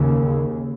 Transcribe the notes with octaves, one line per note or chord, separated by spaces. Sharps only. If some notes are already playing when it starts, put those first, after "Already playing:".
Already playing: D#2 C#3